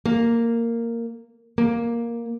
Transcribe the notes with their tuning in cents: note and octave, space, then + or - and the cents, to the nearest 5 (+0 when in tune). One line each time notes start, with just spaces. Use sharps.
A#3 -10
A#3 +5